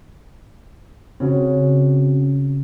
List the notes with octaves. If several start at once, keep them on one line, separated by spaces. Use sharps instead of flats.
C#3 C4 C#4 F#4